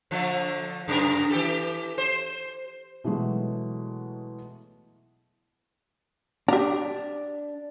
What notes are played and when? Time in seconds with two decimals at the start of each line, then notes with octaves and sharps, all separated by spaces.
0.11 D3 F3 A3
0.88 F#2 C3 A#4
1.30 E3 G4 A4
1.98 C5
3.04 B2 E3 F#3 G#3 A3
6.48 D4 G4 A#5